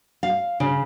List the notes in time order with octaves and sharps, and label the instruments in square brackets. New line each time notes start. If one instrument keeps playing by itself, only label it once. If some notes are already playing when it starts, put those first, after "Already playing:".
[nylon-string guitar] F5
C#3